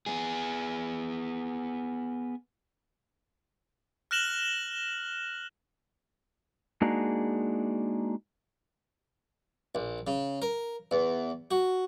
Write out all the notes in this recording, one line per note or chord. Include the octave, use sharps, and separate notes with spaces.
B3 G#4
F6 F#6 A#6 E7 F#7 G7
G#3 A#3 D4 D#4 F#4 G#4
A#1
C#3
A#4
E2
F#4